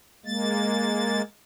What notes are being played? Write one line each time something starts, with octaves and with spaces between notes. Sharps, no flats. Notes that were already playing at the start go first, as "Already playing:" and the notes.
G#3 A#3 A6